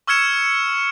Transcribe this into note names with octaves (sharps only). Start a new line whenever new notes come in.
C#6 E6 F6 G#6 C#7 E7